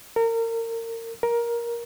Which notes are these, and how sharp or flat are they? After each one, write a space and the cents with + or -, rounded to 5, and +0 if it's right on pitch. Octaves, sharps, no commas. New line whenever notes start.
A#4 -30
A#4 +15